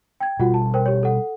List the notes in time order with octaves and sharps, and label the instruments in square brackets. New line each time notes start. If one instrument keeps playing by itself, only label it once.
[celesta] G5 G#6
[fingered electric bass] B2 G3 [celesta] F4 F#4 F#5
[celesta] A5
A#4 C5 G5
G4 C#5
A4 F#5